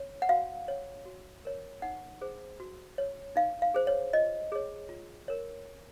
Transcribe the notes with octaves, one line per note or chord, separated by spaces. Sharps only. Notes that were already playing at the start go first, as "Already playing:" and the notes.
Already playing: C#5
F#5
F#4 F5
C#5
F#4
A#4 C#5
D#4 F#5
G#4 C5
F#4
C#5
D#4 F5
F5
G#4 C5
C#5
F4 D#5
G#4 C#5
F4
A#4 C#5